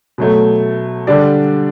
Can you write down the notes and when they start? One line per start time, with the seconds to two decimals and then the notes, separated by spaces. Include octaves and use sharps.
0.18 B2 F#3 A3
1.07 D3 G3 D4 G4 D5